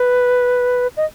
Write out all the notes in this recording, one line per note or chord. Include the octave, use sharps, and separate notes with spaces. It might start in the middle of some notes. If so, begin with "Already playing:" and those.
Already playing: B4
D#5